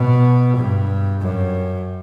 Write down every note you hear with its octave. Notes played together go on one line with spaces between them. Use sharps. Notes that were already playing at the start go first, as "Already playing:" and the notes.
Already playing: B2
G2
F#2